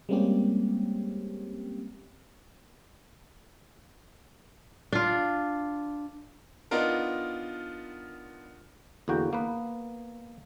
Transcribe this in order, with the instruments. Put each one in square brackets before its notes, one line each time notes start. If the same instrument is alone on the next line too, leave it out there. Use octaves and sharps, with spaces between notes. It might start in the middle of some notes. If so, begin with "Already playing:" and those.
[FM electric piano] G3 G#3 A#3 C4 C#4 G4
[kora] D4 F4
[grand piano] B3 D4 D#4 F4 A#4
[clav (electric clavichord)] E2 D3 A#3 F#4 G5
A#3 B3 B4